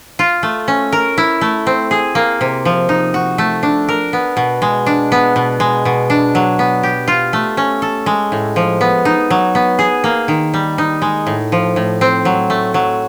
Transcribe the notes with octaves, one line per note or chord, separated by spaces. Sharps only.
F4
A3
C#4
A#4
E4
A3
C4
G#4
A#3
C3
F3
D#4
F#4
A3
D4
A#4
B3
B2
G#3
D4
B3
B2
G#3
B2
D4
F#3
B3
G4
F4
A3
C#4
A4
G#3
A2
F3
B3
D#4
F#3
B3
G#4
A#3
D#3
G3
D#4
G#3
A2
F3
A2
C4
F#3
A3
F#3